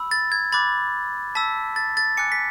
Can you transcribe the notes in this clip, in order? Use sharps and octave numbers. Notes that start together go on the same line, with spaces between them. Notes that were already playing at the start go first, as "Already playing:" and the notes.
Already playing: B5 E6
A6
G#6
B5 D6 F#6 A6
A5 E6 B6
A6
A6
G#5 D6 F#6 C#7
B6